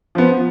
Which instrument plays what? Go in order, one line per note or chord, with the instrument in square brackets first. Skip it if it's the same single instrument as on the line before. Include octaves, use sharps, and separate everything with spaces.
[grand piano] F3 B3